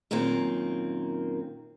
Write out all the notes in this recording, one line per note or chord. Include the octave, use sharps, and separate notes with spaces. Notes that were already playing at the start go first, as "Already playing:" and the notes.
F#2 A#2 D#3 A#3 C4